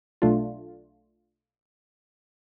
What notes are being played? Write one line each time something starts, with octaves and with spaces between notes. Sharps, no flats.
B1 A3 D4 F4